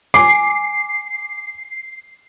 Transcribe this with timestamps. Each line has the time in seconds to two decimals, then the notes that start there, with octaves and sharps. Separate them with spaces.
0.14 G#5 D6 C7